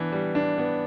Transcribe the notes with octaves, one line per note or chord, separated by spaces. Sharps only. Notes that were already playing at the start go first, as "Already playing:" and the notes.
Already playing: E3 B3 D4
G3
D4
B3